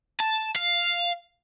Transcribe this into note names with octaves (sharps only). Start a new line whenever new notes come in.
A5
F5